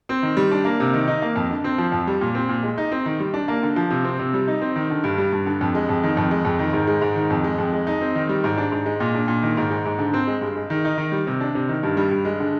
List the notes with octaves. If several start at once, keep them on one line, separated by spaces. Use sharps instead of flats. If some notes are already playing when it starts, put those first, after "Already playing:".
C4
D#3
G3
D4
A#3
C3
D#3
D#4
A#3
F2
D3
C4
F3
F2
G3
A#2
C4
A#2
G#3
D#4
C4
D#3
G3
D4
A#3
D3
F3
C3
C4
C3
G3
D#4
C4
D#3
D3
G2
G3
G2
D3
F2
G#3
F2
D#3
F2
G#3
F2
D#3
G#2
G#3
G#2
D#3
F2
G#3
F2
G#3
D#4
C4
D#3
G3
G#2
D4
G#2
G#3
A#2
D4
A#2
D#3
G#2
G#3
G#2
D3
C4
G#3
G2
G#3
D#3
D#4
D#3
G3
C3
D4
C3
D#3
G2
G3
G2
G#3
D3